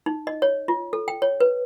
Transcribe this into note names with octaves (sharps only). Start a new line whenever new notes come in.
D#4
D#5
C#5
F4
A4
G5
C#5
B4